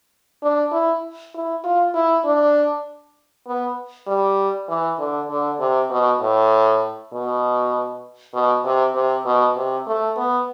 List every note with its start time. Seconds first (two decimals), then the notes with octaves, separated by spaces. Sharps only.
0.43 D4
0.72 E4
1.34 E4
1.64 F4
1.94 E4
2.25 D4
3.47 B3
4.07 G3
4.69 E3
4.99 D3
5.29 D3
5.60 C3
5.90 B2
6.21 A2
7.13 B2
8.34 B2
8.65 C3
8.95 C3
9.25 B2
9.56 C3
9.87 A3
10.17 B3